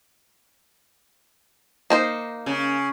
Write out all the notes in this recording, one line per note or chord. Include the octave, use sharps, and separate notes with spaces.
A#3 D#4 C5
C#3